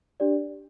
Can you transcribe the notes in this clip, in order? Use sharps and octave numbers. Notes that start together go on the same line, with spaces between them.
D4 G4 D5